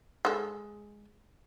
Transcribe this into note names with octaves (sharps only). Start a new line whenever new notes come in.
G#3 A4